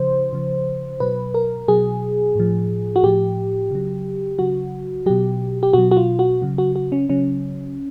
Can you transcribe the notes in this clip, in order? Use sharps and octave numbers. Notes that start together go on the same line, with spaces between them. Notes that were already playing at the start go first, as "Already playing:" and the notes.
Already playing: C#3 F3 C5
C#3 F3
B2 F#3 B4
A#4
B2 F#3 G#4
A2 F3
F#4
A2 F3 G4
C#3 F#3
C#3 F#3 F#4
B2 F#3 G4
G4
B2 F#3 F#4
F#4
F4
F#4
C#3 F#3
F#4
F#4
C#4
C#3 F#3 C#4